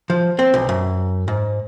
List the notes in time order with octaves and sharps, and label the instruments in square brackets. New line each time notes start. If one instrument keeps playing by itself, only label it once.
[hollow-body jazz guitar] F3
C4
B1
F#2
G#2